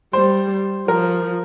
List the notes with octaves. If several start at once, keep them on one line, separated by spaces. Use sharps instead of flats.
G3 C5
F3 A#4